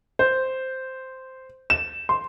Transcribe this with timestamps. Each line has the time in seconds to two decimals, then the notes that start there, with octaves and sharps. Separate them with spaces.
0.19 C5
1.70 E7
2.09 C6